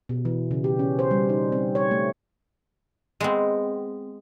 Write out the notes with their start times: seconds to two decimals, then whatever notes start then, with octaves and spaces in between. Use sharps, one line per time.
0.09 B2
0.25 E3
0.51 C#3
0.64 G4
0.79 C#4
0.99 C5
1.11 G3
1.29 D#4
1.52 C4
1.75 C#5
1.91 A3
3.20 G#3 B3 C4